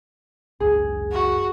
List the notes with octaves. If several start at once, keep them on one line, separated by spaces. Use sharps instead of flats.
G#1 C#2 F#2 G#4
F#4